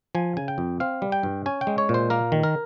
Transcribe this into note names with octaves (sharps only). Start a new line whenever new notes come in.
F3 G#5
C#3 G#5
G5
F2
C4 F5
G3
G5
G2
C#4 G#5
G5
G#3
C#5
A#2
C5
A#3 A#4
D#3
A#4